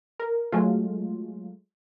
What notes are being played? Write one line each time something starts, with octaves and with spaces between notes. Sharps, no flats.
A#4
F#3 G#3 A3 F4